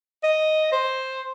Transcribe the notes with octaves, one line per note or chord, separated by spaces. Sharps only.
D#5
C5